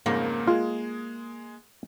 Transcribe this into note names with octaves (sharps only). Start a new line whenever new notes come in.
F2 G#2 C#3 A#3
G#3 F4 G#4